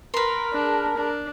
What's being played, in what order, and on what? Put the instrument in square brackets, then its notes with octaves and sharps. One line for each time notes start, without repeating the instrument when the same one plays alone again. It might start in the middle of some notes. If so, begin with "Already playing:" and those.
[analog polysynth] A#4 [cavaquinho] B4 C6
[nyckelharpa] D4 [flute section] G#4 A5
[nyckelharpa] D4